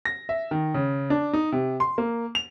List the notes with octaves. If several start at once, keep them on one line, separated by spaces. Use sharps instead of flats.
A#6
E5
D#3
C#3
D4
D#4
C3
C6
A#3
F7